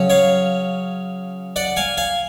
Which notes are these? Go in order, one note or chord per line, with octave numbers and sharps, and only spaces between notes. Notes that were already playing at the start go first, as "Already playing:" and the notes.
Already playing: C#3 F#3 C#4
C#5 F5
D5 F#5
F5 G#5
F5 G#5